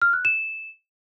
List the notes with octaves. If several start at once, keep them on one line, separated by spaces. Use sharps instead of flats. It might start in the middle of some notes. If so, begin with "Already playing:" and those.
F6
F#6
E7